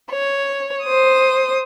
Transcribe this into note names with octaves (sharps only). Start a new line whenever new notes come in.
C#5
C5 D#6